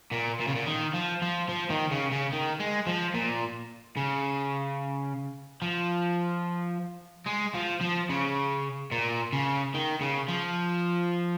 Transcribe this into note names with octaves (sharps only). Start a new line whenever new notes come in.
A#2
A#2
C#3
A#2
D#3
F3
F3
F3
D#3
C#3
C#3
D#3
G#3
F3
A#2
C#3
F3
G#3
F3
F3
C#3
A#2
C#3
D#3
C#3
F3